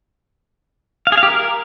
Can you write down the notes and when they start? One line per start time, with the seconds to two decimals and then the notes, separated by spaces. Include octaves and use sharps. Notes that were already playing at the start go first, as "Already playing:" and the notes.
1.07 F5
1.12 G#4
1.17 F5
1.23 G4
1.28 A#4